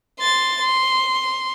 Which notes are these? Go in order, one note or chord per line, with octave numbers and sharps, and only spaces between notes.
C6 A6
C6